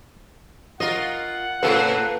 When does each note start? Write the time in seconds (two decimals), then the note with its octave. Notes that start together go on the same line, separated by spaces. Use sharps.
0.80 F4 A#4 D#5 F#5
1.63 A2 C#3 A#3 C4 A4 B4